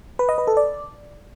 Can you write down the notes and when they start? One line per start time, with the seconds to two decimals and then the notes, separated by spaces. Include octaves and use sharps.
0.19 B4
0.29 D#5
0.38 B4
0.47 A4
0.57 D5